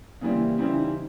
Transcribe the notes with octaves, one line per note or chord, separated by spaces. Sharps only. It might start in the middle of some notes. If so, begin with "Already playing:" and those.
C#3 E3 G3 A#3 C4 E4
C#3 E3 G3 C4 C#4 E4
D#4